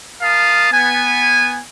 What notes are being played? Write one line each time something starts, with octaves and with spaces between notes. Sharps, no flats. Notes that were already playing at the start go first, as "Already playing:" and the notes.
A#4 F5 A5 D#6
B3 G#5